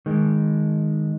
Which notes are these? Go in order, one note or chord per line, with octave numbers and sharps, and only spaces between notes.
D#3 G#3